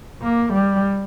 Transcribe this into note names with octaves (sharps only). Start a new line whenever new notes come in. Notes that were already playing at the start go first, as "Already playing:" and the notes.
A#3
G3